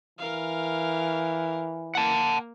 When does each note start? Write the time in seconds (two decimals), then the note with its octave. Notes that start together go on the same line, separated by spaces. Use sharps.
0.19 E3 A#4 F5
1.95 A#3 F#5 A5